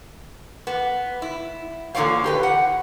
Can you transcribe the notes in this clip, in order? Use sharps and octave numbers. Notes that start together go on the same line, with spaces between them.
B3
E4
E2 A#2 D3 F3 C#5 F5
G4 A#4 B4
F#5